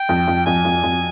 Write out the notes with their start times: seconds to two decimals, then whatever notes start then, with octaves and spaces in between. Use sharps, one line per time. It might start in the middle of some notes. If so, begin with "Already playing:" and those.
Already playing: G5
0.09 F2
0.27 F2
0.46 F2 G#5
0.65 F2
0.83 F2